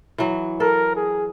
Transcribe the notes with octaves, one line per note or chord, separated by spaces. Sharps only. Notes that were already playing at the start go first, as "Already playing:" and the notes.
E3 F#3
A4 A#4
G#4